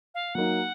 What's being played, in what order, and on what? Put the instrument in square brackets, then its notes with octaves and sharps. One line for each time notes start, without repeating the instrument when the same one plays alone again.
[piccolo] F5
[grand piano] F#3 A#3 D#4 [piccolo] F#5